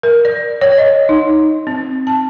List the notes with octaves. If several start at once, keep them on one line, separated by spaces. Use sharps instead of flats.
A#4
D5
C#5
D#5
D#4
C4
A5